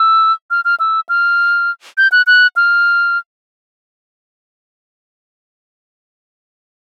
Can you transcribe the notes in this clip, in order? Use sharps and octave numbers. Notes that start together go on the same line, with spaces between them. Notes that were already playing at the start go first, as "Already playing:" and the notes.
Already playing: E6
F6
F6
E6
F6
G6
F#6
F#6
F6